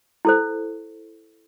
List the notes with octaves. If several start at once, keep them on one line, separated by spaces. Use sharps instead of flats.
E4 A4 C5